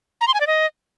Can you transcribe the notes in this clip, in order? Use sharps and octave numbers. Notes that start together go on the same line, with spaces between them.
A#5
C6
G#5
D5
D#5